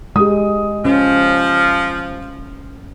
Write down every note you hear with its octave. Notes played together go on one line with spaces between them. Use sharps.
G#3 G4 D#6
F3 C#4